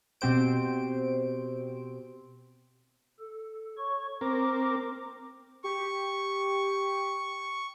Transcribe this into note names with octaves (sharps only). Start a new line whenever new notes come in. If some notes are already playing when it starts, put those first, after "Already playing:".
B2 C4 G4 C5 D7
A4
C#5 C#6
C4 A#4 D6
G4 C#6